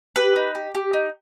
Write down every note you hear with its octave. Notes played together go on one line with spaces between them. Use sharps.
G4 B4
D#4
G4
G4
D#4